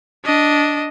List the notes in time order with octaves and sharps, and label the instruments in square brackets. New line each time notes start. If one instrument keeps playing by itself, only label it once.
[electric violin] D4 D#5